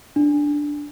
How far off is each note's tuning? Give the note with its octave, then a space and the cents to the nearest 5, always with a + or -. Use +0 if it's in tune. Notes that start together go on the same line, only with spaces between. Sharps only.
D4 +0